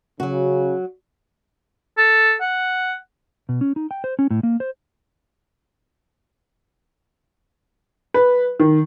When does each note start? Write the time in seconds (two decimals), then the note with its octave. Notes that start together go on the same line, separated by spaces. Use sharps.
0.20 C#3 F#3 F#4
1.98 A4
2.41 F#5
3.49 B2
3.61 C#4
3.76 D#4
3.91 G5
4.04 C5
4.19 C#4
4.31 A2
4.43 A#3
4.60 C5
8.14 B4
8.60 D#3